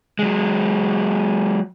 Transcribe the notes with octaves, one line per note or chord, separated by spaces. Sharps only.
F#3 G#3